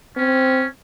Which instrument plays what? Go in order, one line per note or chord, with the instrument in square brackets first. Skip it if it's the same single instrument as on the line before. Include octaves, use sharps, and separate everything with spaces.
[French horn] C4 [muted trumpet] C#4